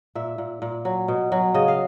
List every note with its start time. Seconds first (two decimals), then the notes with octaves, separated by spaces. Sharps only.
0.15 A#2 E5
0.38 A#2
0.62 A#2
0.85 F#3
1.08 B2
1.32 F#3
1.54 C#3 D#5
1.68 F5